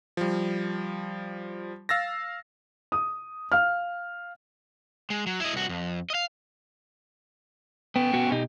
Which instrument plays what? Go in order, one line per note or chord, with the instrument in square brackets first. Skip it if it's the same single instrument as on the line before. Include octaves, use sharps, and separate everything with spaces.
[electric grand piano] F3 G3
F5 E6 A6 A#6
[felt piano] D#6
F5 F6
[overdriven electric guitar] G#3
F#3
E4 D#5
C2 F#4
F2
D#5 F5
[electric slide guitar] B3 [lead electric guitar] C#4 G5
[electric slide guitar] B3 F#4
B2 D#4 G4